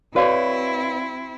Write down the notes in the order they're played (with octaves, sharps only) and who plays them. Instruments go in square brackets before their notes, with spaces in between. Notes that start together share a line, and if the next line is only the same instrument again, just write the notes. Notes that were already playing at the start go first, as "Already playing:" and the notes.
[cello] C4 E4 [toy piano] F#4 [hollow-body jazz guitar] B4 C#5 [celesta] D5 F5